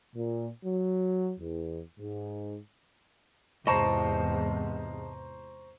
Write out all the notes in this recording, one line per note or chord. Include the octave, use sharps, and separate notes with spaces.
A#2
F#3
E2
G#2
E2 G#2 C3 C5 D#5 A5 A#5 C#6